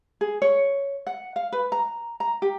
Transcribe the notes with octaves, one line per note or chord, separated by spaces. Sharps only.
G#4
C#5
F#5
F5
B4
A#5
A#5
G4